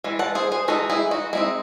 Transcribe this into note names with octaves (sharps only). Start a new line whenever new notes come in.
E3 G#3
F#5 A5
G#4 C5
G#4 C5
E3 G#3 D#4 F#4 A4
E4 G#4
D#4 F#4
G#3 C4 D#4 E4